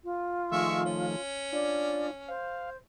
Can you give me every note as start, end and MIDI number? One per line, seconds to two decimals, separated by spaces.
0.04 1.20 65
0.52 1.16 51
0.52 1.16 53
0.52 0.82 56
0.52 1.16 57
0.52 0.82 76
0.52 0.82 85
0.85 2.33 61
1.53 2.11 62
1.53 2.11 65
1.53 2.06 74
2.28 2.77 72
2.28 2.70 77